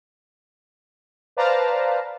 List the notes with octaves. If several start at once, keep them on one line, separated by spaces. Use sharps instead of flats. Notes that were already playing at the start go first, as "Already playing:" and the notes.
B4 C5 D5 F5 A5 A#5